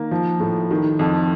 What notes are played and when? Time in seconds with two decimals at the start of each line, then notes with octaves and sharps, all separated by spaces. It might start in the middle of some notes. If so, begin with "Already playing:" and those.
Already playing: D#3 A#3
0.11 F3
0.40 A2
0.71 D#3
0.99 F2